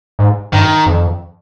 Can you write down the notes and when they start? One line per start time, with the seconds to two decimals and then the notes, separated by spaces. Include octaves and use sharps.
0.19 G#2
0.53 G2 D#3
0.86 F2